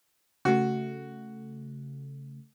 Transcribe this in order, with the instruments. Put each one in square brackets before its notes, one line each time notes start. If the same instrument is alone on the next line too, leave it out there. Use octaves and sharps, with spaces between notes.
[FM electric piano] C#3 A3 [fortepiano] F#4